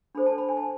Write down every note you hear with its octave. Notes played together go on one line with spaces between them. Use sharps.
D4 A4 C5 B5
A5
B5
G#5
A5